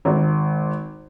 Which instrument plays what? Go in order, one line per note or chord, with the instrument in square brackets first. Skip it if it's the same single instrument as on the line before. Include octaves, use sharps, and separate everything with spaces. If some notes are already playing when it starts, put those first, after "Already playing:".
[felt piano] G#1